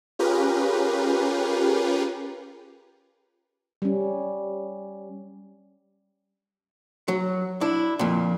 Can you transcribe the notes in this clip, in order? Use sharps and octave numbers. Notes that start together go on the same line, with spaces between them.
C#4 F4 G4 G#4 A#4 B4
G3 C#4
F#3
D4 E4
F2 A#2